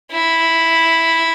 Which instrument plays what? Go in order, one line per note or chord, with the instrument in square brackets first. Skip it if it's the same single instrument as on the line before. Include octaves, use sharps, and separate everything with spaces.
[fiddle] E4